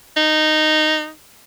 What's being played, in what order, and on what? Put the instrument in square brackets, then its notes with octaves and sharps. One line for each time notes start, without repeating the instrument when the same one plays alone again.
[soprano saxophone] D#4